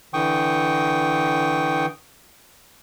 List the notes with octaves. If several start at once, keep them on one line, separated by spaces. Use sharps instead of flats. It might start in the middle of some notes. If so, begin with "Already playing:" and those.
D3 E3 G5 C#6 D#6